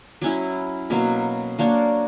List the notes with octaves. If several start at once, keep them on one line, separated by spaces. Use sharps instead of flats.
F#3 C#4 E4
B2 F#3 A#3
A#3 D4 F#4 C#5